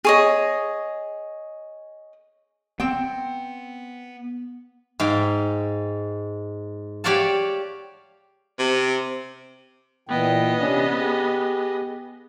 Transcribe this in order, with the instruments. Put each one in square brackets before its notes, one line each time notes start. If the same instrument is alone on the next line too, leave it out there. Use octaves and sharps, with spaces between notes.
[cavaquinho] G#4 C#5 D#5
[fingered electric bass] B3 [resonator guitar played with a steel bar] C4 G5
[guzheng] G#2 F5 G5
G4 C#5 D5 F5 F#5 A5
[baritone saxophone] C3
[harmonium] A#2 E3 G5 [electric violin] B3 D#5
[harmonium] C3 C#4 D4
G4 G#4